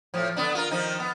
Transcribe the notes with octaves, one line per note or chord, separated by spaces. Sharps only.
A2 F3
D3 B3 D4
F4 A#4
D#3 F3 D#4
B3